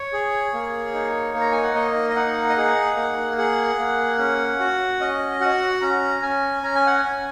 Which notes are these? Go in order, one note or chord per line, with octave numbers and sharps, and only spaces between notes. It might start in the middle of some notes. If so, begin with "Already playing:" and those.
Already playing: C#5
G#4
A#3
D#4
A#3
A#5
G#5
F#5
A#3 D#5
D#5
D#4 F#5
D#5
G#4 F#5
A#3
G#4 F#5
A#3
C#4
F#4
C#4 D#5
F#4 F#5
C#4 A#5
C#4 G#5
C#4 A#5
G#5
F#5
G#5
C#4